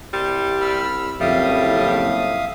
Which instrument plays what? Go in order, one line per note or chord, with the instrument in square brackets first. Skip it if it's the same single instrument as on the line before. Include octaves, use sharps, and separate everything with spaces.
[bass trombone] C2 [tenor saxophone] G3 [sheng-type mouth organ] C6
[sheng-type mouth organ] B5 E6 F6
[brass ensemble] F#1 F2 [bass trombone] A2 [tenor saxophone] G3 [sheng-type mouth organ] E5 F5 D#6